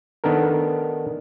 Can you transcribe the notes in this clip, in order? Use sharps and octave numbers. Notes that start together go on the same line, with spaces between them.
D#3 B3 D4 A4 A#4